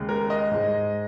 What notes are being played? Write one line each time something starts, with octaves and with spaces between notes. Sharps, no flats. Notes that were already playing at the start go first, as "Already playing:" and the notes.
Already playing: D#2 C#3 G#3
A#4
D#5
G#2 G#3